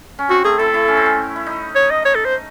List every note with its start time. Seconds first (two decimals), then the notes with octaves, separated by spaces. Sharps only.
0.19 C#4
0.29 C4 F#4
0.44 A3 G#4
0.58 E4 A4
0.74 E4
0.88 C#4
0.97 C4
1.06 C#4
1.36 E4
1.46 D#4
1.76 C#5
1.90 D#5
2.05 C#5
2.15 A4
2.25 C5